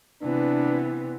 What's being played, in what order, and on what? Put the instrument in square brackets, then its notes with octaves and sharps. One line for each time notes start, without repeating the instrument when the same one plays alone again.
[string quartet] C3 E3 B3 [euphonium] D4